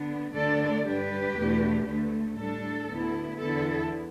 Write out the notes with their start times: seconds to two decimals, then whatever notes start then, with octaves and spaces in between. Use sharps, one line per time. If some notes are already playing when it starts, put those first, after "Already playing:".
Already playing: D3 B3 D4
0.35 D2 D3 A3 D4 A4 D5
0.85 G2 G3 D4 G4 B4
1.37 E2 B2 A3 D4
1.88 D2 D3 A3
2.39 A2 G3 D4 A4
2.90 D2 D3 B3 E4
3.41 E2 D3 B3 E4 A4